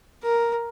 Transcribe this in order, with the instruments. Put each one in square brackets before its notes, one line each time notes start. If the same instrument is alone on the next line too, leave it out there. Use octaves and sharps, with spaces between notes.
[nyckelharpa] A#4